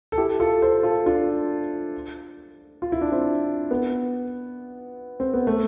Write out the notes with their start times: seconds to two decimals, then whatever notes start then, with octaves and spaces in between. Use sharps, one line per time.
0.12 A4
0.18 E4 G4
0.40 F4 A4
0.62 A4 C5
0.83 F4 A4
1.06 D4 F4
2.82 F4
2.92 E4
3.01 D4
3.12 C4 E4
3.71 B3
5.20 C4
5.34 B3
5.47 A3